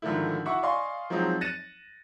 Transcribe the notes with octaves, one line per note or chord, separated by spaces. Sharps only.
G#2 D3 D#3 F3 A3 E4
E4 F#4 E5 F#5 C#6 D6
D5 D#5 F5 G#5 C6 C#6
F3 F#3 G#3 C4 D#4
F#6 A6 A#6 C#7 D#7 E7